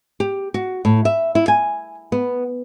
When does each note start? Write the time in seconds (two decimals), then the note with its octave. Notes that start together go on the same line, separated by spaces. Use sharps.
0.20 G4
0.54 F#4
0.85 A2
1.05 E5
1.35 E4
1.48 G#5
2.12 B3